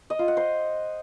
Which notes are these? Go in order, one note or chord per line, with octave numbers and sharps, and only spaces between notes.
D#5
F4
F#5
C5